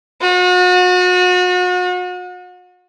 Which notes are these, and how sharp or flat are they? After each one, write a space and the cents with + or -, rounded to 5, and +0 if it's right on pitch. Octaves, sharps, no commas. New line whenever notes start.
F#4 -40